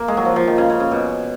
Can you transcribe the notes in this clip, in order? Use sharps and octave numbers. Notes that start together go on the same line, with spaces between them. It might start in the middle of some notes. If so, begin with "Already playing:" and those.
Already playing: A#3
G#3
F#3
F3
F3
D#3
C#3
C#3
C#3
B2